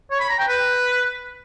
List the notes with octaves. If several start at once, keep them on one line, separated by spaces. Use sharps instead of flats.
C#5
B5
A#5
G5
B4